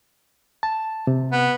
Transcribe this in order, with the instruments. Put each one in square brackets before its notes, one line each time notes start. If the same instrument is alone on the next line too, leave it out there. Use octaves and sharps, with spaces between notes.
[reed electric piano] A5
C3
[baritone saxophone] B3